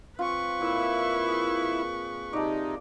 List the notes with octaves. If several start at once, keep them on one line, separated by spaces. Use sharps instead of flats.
C4 F4 B4 C#6
A#2 E4
G#4
C3 D#4 D5 A5